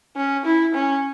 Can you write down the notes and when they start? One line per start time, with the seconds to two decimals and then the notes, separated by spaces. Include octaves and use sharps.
0.16 C#4
0.45 E4
0.74 C#4